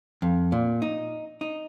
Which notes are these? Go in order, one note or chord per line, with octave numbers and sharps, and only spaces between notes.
F2
A#2
D#4
D#4